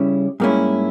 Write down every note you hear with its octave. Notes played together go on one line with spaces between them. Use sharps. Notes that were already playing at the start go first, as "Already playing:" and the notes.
Already playing: C#3 G3 C#4 E4
G#2 G3 A#3 C#4 E4